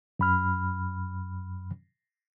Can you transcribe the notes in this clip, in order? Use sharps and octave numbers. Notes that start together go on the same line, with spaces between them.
F#2 B5 F6